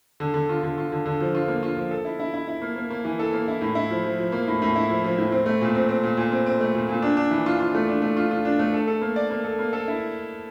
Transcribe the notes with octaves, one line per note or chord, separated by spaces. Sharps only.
D3
D3
F4
D3
F4
D3
D3
F3
F4
A#3
F4
F3
A4
E4
E4
E4
E4
A#3
A#3
A#3
E3
A4
A#3
E4
A2
E4
F3
F3
F3
A#3
A2
A2
E4
F3
F3
A2
C4
A3
A#2
C4
C4
A#2
A#2
C4
C4
A3
A#2
A#2
D4
D4
E3
F4
F4
A3
D4
A3
F4
F4
D4
A3
A4
A4
A#3
D5
A#3
A4
A#3
A4
E4